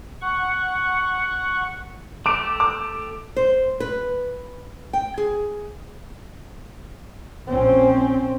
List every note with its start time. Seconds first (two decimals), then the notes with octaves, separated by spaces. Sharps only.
0.21 F#5 C#6
2.26 A3 G4 D6 D7
2.60 D6
3.37 C5
3.80 B4
4.93 G5
5.18 G#4
7.47 A#1 C4 C#4